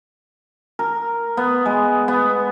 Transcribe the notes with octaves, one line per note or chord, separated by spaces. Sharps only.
A#4
B3
G#3
B3